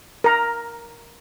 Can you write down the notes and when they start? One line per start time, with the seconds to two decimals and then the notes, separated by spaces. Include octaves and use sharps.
0.24 A#4 A#5